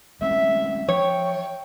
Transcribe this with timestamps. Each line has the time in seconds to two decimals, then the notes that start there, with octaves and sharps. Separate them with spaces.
0.22 G#3 C4 C#4 E5
0.88 F3 C#5 G5